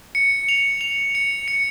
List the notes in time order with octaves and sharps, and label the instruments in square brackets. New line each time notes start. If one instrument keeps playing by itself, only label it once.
[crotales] C#7
F7
F7
C#7
C#7